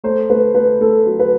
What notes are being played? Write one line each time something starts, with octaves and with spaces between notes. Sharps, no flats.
A3 C5
A3 B4
A3 B4
A3 A4
F#3
B4